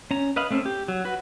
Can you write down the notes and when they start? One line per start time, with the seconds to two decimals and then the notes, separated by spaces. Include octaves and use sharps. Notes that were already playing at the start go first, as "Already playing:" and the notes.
0.11 C#4 A#5
0.36 B4 D#5 F5 B5
0.51 A3 C4 C#4
0.66 G4
0.88 F#3
1.05 F#4 B4